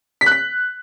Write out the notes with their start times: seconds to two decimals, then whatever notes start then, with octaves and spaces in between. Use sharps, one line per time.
0.21 B6
0.26 F#6
0.32 B6